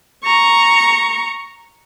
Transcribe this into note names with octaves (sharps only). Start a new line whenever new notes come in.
A#5 C#6